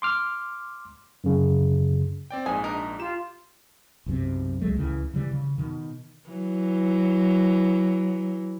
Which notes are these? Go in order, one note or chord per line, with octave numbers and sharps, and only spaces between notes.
C6 D6 F6
F#2 C#3
C4 D5 G5
A#1 G#2 G#4 G#5
D4 A#4 D#5
F4 G4 E7
B1 F#2 C3
C#2 F#3 G#3 A3
C#2 C#3 E3
C#3 E3 G3
C#3
B2 D#3
E3 F#3